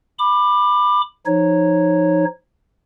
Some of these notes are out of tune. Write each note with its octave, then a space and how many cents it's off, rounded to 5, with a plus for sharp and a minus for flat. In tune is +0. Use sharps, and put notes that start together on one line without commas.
B5 +0 D6 +25
F3 -15 D#4 -5 C#5 -10